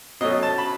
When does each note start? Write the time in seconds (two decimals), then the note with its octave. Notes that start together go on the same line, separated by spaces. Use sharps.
0.21 B2 F#3 A3 C#4 D#5
0.43 A5
0.58 B5